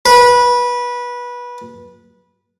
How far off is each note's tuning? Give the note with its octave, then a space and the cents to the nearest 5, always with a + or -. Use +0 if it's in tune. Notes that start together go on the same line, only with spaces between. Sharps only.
B4 -20